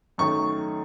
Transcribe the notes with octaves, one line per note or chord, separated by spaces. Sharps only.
F#2 D#3 A3 C#6